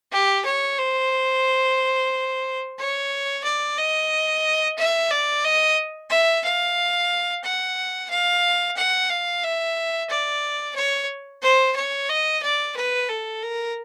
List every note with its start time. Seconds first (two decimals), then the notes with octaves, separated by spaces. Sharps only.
0.12 G4
0.45 C#5
0.79 C5
2.78 C#5
3.44 D5
3.78 D#5
4.78 E5
5.11 D5
5.45 D#5
6.10 E5
6.44 F5
7.44 F#5
8.10 F5
8.77 F#5
9.10 F5
9.43 E5
10.10 D5
10.76 C#5
11.42 C5
11.76 C#5
12.09 D#5
12.43 D5
12.76 B4
13.10 A4
13.43 A#4